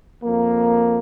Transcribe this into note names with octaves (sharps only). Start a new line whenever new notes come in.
F2 A#3